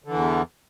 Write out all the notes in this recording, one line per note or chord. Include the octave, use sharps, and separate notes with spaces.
E2 D3 E3